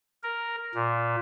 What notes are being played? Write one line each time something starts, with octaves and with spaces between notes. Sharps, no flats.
A#4
A#2